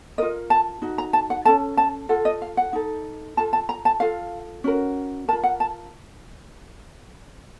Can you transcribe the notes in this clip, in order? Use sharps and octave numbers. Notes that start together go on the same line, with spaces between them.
F4 A#4 D#5
A5
D#4 F#4
A#5
A5
F#5
C#4 A4 A5
A5
F4 A4 F#5
D#5
F5
F#5
D#4 A4
F4 A4 A5
A5
A#5
A5
F4 A4 F5
C#4 F#4 A#4
F4 A#4 A5
F#5
A5